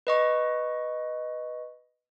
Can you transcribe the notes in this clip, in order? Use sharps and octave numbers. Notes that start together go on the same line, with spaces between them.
B4 D#5 C#6